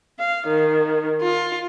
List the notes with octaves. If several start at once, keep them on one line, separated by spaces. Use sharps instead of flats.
F5
D#3
F4